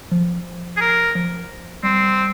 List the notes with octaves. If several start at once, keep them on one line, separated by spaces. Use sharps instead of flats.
F3
G#4
A#4
F3
G3 C4